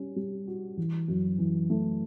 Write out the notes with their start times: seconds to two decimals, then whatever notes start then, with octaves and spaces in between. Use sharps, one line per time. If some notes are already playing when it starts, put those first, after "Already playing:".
Already playing: G3 C#4
0.16 G3
0.47 F#4
0.77 E3
1.08 F#2
1.39 E3
1.70 A3